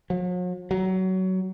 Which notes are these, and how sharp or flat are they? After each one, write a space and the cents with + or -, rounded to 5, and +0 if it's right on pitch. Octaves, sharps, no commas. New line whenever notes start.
F#3 -45
F#3 +20